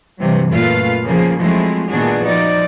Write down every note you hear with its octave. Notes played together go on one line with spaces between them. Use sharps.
G2 C3 E3 F#3
F#2 A#2 A3 F4 B4 F5
C#3 F3 A#3 G#4
F3 F#3 G#3 A3 C4 E4
A#2 D#3 B3 D4 F#4 G#4
F3 D#4 D5